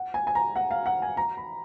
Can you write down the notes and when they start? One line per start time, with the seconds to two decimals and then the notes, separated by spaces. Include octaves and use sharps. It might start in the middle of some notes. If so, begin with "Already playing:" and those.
Already playing: F#5
0.14 G#5
0.27 G#5
0.35 A#5
0.56 F#5
0.71 F5
0.86 F#5
1.02 G#5
1.17 A#5
1.37 B5